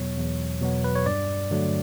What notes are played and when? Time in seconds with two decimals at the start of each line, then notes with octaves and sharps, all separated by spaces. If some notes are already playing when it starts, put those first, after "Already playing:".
Already playing: E2 B2 F#3 B3 C#5
0.17 E2
0.61 B2 F#3 B3
0.84 B4
0.95 C#5
1.06 G2 D5
1.51 D3 F#3 A3